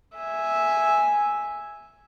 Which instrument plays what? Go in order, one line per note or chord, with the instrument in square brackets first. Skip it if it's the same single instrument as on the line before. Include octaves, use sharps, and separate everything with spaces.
[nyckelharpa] E5 G#5